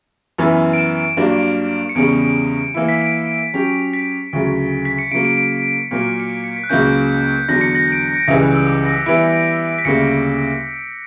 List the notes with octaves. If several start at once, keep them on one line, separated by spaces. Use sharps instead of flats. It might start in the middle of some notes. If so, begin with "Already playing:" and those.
F#2 E3 B3 E4
D7
E7
G2 F#3 A#3 D4
C#7
E2 C#3 G3 C#4 D7
E3 A#3 E4
B6
D7
F#3 C#4 G4
B6
D2 C#3 F#3
B6
C#7
C#3 F#3 A#3 D7
D7
D7
A#2 F#3 A#3
C#7
D7
C#7
B6
F#6
C#2 C#3 F#3 A#3 C#4 G6
E2 D3 F#3 A#6
C#7
A#6
D7
C#7
C#7
C#2 C#3 E3 G3 A#6
F#6
E6
D6
A#6
B6
E3 G3 B3 E4 D7
B6
D2 C#3 G3 A#3 C#7